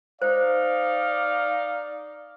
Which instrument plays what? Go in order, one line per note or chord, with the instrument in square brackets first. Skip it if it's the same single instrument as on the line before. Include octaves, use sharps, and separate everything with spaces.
[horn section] D#4 F5 [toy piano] C5 [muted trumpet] D5